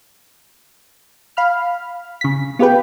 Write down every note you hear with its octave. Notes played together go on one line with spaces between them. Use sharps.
F5 B5 F6
C#3 B6
B3 F4 G4 G#4 B4 G5